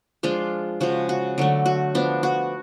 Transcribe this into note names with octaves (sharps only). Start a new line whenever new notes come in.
F3 G#3 D4 F4
C#3 F3 G#3 F#4
F#4
D3 F#3 A3
F#4
F3 B3 D4
F#4